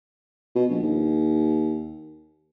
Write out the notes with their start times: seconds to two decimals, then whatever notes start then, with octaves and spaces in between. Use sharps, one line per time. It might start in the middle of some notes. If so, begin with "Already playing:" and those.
0.55 B2
0.69 A#1
0.82 D#2